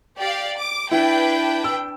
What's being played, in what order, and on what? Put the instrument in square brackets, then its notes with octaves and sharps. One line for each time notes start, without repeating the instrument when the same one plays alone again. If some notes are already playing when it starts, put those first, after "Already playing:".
[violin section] G4 D5 F5
D6
[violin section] D4 B4 G5 [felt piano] E4
[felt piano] E6